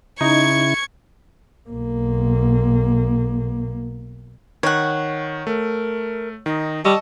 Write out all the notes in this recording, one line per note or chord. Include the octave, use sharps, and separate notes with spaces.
C#3 D#4 E4 C#6 G#6
B1 A#3
D#3 C#5 F#5
A3 A#4
D#3 D#4
G3 D#5 A5 C#6 E6